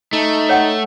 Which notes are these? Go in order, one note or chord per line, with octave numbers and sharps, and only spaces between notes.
A3 D#4
C#5 F#5 G5